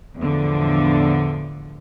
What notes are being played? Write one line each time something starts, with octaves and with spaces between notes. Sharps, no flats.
E2 A2 D3 F3